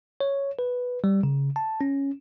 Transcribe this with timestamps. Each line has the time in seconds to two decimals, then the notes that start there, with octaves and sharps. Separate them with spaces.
0.20 C#5
0.59 B4
1.04 G3
1.23 C#3
1.56 A5
1.81 C#4